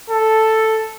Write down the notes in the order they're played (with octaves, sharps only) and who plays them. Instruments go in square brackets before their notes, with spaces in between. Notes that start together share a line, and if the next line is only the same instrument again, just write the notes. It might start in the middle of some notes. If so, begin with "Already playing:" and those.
[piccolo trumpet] A4